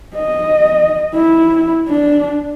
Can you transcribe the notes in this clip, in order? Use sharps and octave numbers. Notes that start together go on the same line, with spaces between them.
D#5
E4
D4